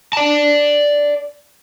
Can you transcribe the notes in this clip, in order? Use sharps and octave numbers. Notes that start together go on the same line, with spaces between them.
D5 A5